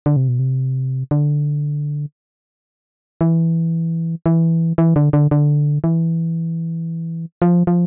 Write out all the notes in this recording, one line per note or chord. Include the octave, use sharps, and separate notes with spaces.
D3
C3
B2
C3
D3
E3
E3
E3
D3
D3
D3
E3
F3
F3